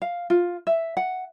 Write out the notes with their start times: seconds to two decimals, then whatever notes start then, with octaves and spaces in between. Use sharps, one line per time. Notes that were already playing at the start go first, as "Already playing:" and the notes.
0.02 F5
0.30 F4
0.67 E5
0.97 F#5